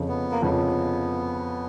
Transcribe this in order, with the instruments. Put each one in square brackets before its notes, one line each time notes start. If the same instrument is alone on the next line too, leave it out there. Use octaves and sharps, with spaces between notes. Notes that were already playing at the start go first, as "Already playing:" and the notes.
Already playing: [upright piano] F2 C#3 F3
[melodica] B3
A#3
[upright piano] F2 C#3 F3 [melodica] B3